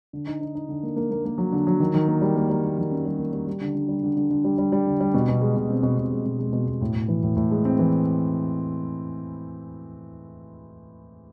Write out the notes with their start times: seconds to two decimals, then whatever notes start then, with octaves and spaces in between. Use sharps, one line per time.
0.13 D3
0.27 D#4
0.41 D#4
0.55 D#4
0.69 D3
0.83 A#3
0.96 A#3
1.11 A#3
1.25 A#3
1.38 F#3
1.52 D3
1.67 F#3
1.80 D#3
1.94 D#3
2.08 A#3
2.21 G3
2.36 A#3
2.49 G3
2.64 A#3
2.78 D#3
2.91 C#4
3.05 G3
3.20 A#3
3.33 G3
3.47 G3
3.61 D3
3.75 D3
3.88 G3
4.03 D3
4.16 D3
4.30 D3
4.44 G3
4.58 G3
4.72 G3
4.87 D3
5.00 G3
5.14 B2
5.29 B2
5.42 G#3
5.56 B2
5.70 C4
5.83 B2
5.98 B2
6.12 G#3
6.26 B2
6.39 G#3
6.53 B2
6.68 B2
6.81 A2
6.95 A2
7.08 E3
7.23 A2
7.37 A2
7.51 G#3
7.65 C4
7.79 E3